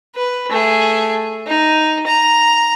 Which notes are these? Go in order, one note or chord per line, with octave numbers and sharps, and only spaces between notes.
B4
A3 G#4
D#4
A#5